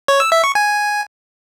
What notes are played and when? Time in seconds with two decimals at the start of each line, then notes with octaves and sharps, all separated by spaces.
0.08 C#5
0.20 E6
0.32 E5
0.44 C#6
0.55 G#5